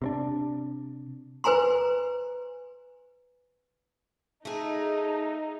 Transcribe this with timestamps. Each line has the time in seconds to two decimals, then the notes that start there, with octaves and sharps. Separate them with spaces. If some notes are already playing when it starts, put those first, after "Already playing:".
0.02 C3 C4 D4
1.44 B4 C5 G#5 A#5 C6
4.45 A3 D#4 G#4